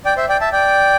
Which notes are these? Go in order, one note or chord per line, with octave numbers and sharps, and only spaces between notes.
D5 G5
C5 E5
D5 G5
E5 A5
D5 G5